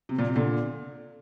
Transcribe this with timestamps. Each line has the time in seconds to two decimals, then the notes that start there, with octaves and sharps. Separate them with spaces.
0.09 C3
0.19 A#2
0.27 C3
0.35 A#2 D3